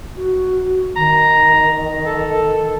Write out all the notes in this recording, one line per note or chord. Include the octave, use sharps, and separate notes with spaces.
F#4
D#3 A#5
A4